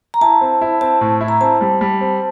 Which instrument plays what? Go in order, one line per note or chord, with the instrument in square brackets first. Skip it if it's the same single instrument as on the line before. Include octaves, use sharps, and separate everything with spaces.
[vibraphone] A#5
[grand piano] E4 [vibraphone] A5
[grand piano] C4
E4
[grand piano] C4 [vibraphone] A5
[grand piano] A2
E4
[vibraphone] A#5
[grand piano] C4 [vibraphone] A5
[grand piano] G3
G3
C4